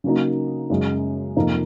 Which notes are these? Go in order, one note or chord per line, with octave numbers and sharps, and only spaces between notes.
C#3 F#3 A#3 D#4
F#2 C#3 G#3
F2 C3 F3 A#3 D#4